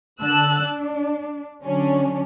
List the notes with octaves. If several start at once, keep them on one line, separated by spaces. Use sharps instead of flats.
D3 A5 E6 F#6
D4
D3 F#3 C#4 D4